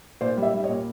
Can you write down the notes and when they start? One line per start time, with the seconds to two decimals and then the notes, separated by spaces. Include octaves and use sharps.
0.21 A#2 C5 D5
0.37 G3
0.42 D5 E5
0.54 G3
0.64 C#5 D#5
0.69 A#2